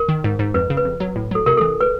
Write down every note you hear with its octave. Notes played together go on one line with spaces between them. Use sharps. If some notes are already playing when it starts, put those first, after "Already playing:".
Already playing: A#4
D#3
G#2
G#2
F2 B4
C#3
B4
F2
F#3
A2
F#3 A4
C3 A#4
E3 A4
B4